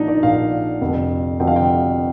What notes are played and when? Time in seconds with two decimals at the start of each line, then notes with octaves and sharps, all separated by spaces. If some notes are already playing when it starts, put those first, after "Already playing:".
Already playing: A#1 A#2 F3 D4 D#4
0.08 D5
0.22 A#1 A#2 F3 F5
0.81 F1 F2 D3 F3
1.40 F1 F2 D3 F3 G5
1.47 F5
1.56 G5